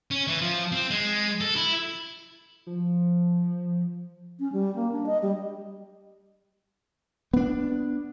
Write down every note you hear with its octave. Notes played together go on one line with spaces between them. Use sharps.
C#4
E3
F3
C4
G#3
A4
E4
F3
C#4
G3
A#3
D4
D#5
G3
B3 D4